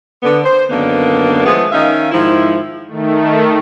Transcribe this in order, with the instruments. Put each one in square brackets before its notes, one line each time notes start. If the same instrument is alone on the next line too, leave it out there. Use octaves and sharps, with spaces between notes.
[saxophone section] D3 B3
C5
F#2 D3 D#3 A#3 B3 D4
F3 G#3 A3 B3 G#4
D#3 C#4 D#4 E5 F5
G#2 D#3 F3 E4
[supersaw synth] D#3 A3